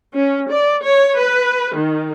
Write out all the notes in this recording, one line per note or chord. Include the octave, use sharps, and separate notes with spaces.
C#4
D5
C#5
B4
D#3